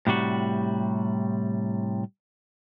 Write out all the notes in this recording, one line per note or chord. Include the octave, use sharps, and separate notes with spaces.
A2 C3 G3 F#4